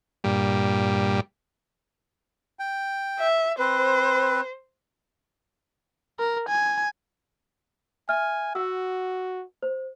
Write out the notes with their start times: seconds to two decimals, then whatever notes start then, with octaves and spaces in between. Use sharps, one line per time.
0.24 G2 A#2 G3
2.59 G5
3.19 E5
3.59 C4 B4 C5
6.19 A#4
6.49 G#5
8.09 E5 G#5 F6
8.55 F#4 F#5 E6
9.62 C5